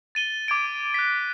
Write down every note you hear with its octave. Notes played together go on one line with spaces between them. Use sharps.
A6 D#7 G7
D6 G#6 D7
F#6 B6